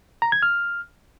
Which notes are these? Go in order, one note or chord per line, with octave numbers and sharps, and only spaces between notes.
A#5
G#6
F6